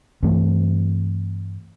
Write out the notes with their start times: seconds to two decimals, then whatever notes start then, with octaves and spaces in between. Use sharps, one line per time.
0.23 G2 E3 A3 C4